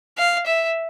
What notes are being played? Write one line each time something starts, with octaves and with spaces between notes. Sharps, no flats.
F5
E5